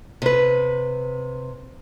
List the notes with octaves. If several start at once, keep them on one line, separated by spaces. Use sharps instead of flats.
C3 B4